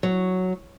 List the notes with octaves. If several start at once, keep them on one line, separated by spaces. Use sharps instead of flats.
F#3